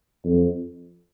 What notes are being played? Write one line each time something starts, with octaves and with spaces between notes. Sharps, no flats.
F2